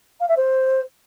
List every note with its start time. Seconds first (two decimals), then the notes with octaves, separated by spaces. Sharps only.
0.20 F5
0.28 E5
0.36 C5